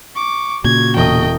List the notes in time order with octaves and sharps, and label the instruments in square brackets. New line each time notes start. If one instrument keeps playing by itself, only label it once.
[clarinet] C#6 [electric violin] D6
[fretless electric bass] A#2 C#3 [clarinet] F#4 [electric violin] G#6
[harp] E1 D#6 [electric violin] D#5 G5